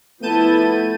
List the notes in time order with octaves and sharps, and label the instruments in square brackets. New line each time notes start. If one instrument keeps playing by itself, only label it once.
[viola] F3 E4 [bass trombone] A3 [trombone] B3 [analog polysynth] A5 G6 D#7